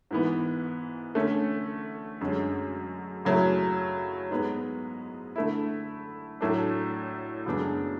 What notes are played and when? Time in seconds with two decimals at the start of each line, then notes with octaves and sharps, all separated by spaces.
0.11 G#2 E3 B3
1.15 D3 A3 C#4
2.21 F#2 D3 G#3 C#4
3.25 C#3 F#3 A3 E4
4.31 G#2 G#3 B3
5.36 D3 A3 E4
6.41 A2 F#3 A3 D4
7.46 F#2 C#3 G#3 B3 D4